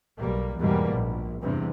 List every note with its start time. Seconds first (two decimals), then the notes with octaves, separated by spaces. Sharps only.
0.18 B1 G3 A#3
0.59 E2 G#2 B2 G3 A#3
0.93 A#1
1.42 E2 G2 C3